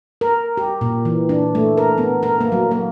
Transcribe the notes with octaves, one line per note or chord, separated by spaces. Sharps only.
A#4
G4
A#2
E3
D4
A3
A#4
B3
A#4
A#3
F#3
A#3